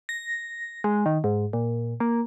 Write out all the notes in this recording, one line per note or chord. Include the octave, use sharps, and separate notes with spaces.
A#6
G#3
D#3
G#2
A#2
A#3